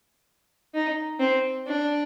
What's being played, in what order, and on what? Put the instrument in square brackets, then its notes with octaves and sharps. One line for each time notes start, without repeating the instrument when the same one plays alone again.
[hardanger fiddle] D#4
C4
D4